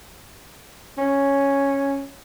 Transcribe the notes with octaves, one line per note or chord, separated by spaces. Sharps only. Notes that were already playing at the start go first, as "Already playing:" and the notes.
C#4